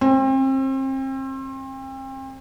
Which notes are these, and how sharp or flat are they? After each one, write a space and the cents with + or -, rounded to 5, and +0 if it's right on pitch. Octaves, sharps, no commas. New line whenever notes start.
C4 +35